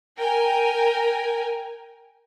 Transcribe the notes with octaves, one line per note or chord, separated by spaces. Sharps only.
A#4 G5 G#5